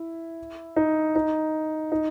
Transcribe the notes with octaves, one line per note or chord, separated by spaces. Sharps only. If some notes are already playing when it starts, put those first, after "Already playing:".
Already playing: E4
D#4
D#4
D#4